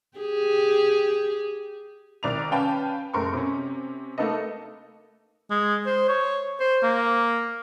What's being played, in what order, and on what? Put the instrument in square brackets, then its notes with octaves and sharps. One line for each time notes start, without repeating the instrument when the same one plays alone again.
[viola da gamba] G4 G#4
[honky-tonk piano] C2 D#3 D5 A#5 F7
C#4 B4 F5 G5 A5 B5
F#1 A3 A#4 C6 C#6
C3 C#4
A3 A#3 D#4 A4 B4 D#5
[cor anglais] G#3
C5
C#5
C5
A#3